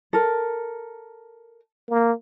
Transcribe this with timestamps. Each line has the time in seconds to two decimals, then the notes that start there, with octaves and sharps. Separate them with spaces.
0.13 A4 A#4
1.90 A#3